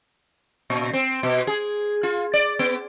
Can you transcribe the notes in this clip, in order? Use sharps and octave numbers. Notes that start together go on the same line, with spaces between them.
A#2
C4
B2
G#4
F4
D5
B3